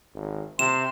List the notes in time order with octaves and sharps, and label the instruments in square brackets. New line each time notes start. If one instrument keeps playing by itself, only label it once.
[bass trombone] G#1
[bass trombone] C3 [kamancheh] C6 [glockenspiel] E7